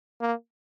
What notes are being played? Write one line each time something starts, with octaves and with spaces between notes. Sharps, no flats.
A#3